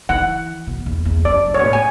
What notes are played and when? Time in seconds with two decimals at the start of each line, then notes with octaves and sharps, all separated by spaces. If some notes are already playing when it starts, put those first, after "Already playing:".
0.09 E3 F#5
0.67 B2
0.86 E2
1.05 E2
1.25 F#2 D5
1.45 A2
1.54 B2 C#5
1.63 A2
1.73 G#5